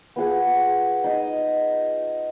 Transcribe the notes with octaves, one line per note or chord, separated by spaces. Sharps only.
B3 F4 G#4 F#5
D#4 D#5